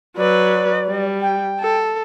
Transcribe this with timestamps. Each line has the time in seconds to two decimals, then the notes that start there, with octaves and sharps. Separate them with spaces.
0.17 F#3 B4 D5
0.88 G3
1.21 G5
1.60 A4